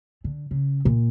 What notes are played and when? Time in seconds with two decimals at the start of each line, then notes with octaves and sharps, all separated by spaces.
0.24 D3
0.51 C#3
0.85 A#2